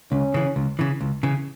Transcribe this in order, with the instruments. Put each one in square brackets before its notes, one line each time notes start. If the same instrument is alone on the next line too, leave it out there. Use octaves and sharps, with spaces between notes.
[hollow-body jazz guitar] C#2 [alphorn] C#4
[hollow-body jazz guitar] C#3 E3
C#2
C#3 E3
C#2
C#3 E3